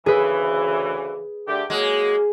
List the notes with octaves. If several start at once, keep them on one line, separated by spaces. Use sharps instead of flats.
D2 C#3 E3 G#4 B4
D3 A3 G4
F#3 G#3 A#3